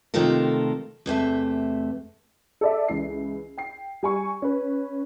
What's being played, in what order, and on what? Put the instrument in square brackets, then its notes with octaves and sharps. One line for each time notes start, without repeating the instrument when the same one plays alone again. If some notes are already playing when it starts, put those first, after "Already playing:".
[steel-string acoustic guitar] C3 D#3 A3 F4 A4 A#4
E2 C3 A3 E5
[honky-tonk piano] A4 D5 E5
C#2 E3 C7
G5 C7
G3 G#5 C#6
C#4 B4